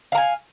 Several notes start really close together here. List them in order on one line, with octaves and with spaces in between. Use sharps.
F5 A#5 G#5